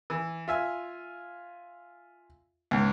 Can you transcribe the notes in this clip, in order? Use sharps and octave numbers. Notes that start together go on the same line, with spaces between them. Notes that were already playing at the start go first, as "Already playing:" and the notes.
E3
F4 E5 G#5
C#2 G#2